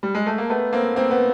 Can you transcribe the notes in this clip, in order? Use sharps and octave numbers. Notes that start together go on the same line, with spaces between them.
G3
G#3
A3
A#3
A3 B3
A#3 C4
A#3 C4
B3